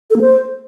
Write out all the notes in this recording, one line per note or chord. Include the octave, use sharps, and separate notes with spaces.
A4
A#3
C5